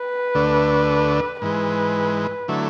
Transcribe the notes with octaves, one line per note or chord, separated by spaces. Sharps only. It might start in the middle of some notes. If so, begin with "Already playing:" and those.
Already playing: B4
D2 D3 A3 D4
G#2 E3 G#3 B4
D3 F#3 A3 E4